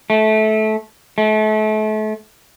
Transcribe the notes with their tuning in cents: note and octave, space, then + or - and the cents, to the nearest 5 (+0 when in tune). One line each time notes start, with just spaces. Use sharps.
A3 -20
A3 -35